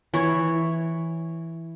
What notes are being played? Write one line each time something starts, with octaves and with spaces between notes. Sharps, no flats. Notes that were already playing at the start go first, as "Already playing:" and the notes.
E3 E4 C#5